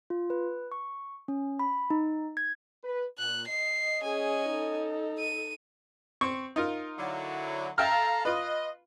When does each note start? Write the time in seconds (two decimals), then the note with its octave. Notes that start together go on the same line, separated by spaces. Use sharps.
0.10 F4
0.30 B4
0.72 C#6
1.28 C#4
1.59 B5
1.90 D#4
2.37 G#6
2.83 B4
3.19 A#2 F#6
3.48 D#5 C7
4.02 C#4 G#4 G#5
4.50 D#4 A4
5.19 D#7
6.21 C4 C#6
6.56 D#4 F4 A#4
6.98 D3 F#3 E4
7.78 A4 E5 F5 G5 A#5 F6
8.25 F4 B4 D#5